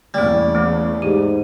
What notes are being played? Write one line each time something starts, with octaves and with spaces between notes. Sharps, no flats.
E2 C#3 G3 A3 A#3
E3 A3
G#2 G4